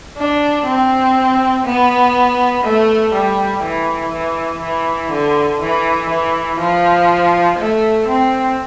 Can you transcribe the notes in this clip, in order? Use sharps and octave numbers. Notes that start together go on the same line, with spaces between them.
D4
C4
B3
A3
G3
E3
E3
E3
D3
E3
E3
F3
A3
C4